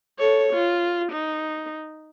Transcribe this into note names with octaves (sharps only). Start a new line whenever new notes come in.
A4 C#5
F4
D#4